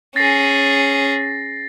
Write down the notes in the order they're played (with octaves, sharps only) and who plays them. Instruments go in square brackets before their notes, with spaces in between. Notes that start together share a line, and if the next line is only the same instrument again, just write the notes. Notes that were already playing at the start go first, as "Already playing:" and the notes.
[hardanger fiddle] C#4 G#4 [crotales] A6 A#6 C7